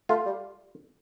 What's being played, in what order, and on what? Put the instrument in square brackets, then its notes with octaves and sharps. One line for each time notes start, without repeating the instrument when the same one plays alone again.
[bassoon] A3 [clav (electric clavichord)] F4
[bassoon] G3